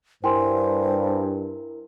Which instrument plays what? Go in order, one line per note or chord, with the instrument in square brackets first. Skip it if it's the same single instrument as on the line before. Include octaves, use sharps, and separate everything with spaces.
[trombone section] G2 [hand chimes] E4 A#4 [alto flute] C5 [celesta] G5 G#5 C6